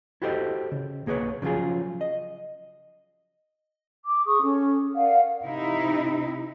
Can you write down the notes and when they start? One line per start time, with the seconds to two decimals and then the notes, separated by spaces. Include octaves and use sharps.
0.22 E4 F#4 G4 A4 C5 D#5
0.72 C#3
1.06 B1 A#3 G#4 B4 C#5
1.42 C#3 F3 F#3 F4 G#4
2.01 D#5
4.05 D6
4.26 G#4 C#6 D#6
4.42 C#4 A4
4.95 A#4 D5 F5 F#5
5.43 C3 D#4 E4